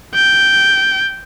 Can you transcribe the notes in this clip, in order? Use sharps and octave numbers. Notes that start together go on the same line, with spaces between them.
G5